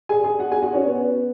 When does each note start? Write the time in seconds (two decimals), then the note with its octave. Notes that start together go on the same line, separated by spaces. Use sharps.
0.09 G#4 G#5
0.24 G#4 G#5
0.39 F#4 F#5
0.51 G#4 G#5
0.62 F#4 F#5
0.73 C#4 C#5
0.85 B3 B4